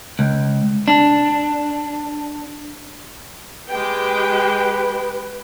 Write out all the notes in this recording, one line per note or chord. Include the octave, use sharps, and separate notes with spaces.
C#2
D4
G#3 G4 B4 G5